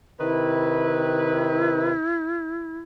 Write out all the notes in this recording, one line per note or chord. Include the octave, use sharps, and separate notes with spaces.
C3 D#3 E4 B4